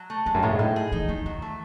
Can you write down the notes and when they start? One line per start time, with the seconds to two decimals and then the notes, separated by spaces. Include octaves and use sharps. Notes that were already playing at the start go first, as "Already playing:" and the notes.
Already playing: F#3
0.10 A3
0.26 E2 G#3
0.34 F#2
0.43 A2 G#3
0.51 G#2
0.59 A2 D#4
0.76 G#4
0.92 E3 D#4
1.09 D#3 E3
1.25 E3 F#3
1.42 A3